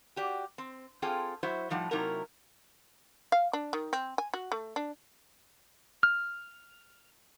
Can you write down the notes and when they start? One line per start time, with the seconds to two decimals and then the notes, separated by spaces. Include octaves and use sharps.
0.16 F#4 G4 D5
0.58 C4
1.02 C4 F4 G#4 A4 F5 G5
1.43 F#3 E4 F#4 C5 E5
1.70 A2 F3 G3 D#4 F#5
1.91 C3 F#3 A#3 D#4 E4 A#4
3.32 F5
3.53 D4
3.73 D#3
3.93 C4
4.18 G#5
4.34 F#4
4.52 A3
4.76 D4
6.03 F6